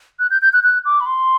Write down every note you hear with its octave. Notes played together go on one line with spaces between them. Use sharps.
F#6
G6
G6
F#6
F#6
D6
B5
C6